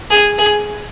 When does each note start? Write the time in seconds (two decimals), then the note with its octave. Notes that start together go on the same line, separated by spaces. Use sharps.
0.11 G#4
0.38 G#4